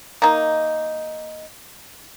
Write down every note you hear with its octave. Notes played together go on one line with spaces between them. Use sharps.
A#3 D#4